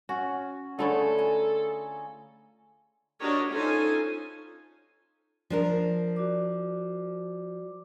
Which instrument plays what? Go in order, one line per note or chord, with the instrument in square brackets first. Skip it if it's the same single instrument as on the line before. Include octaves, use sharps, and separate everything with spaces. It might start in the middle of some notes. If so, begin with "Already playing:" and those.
[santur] C#4 [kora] F#4
[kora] D3 A3 C#5 [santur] F4 G#4 B5 [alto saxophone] A4
[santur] G#5 A#5
[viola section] D4 F#4 G4 A#4 C#5 D#5
C#4 D#4 F4 A4 C5 G#5
[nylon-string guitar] F3 D4 A#4
[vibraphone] F#4 D5 D6